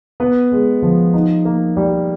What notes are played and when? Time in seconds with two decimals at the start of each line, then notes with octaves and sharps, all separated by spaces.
0.20 B3
0.52 G#3
0.82 F3
1.13 D#4
1.45 A#3
1.77 G3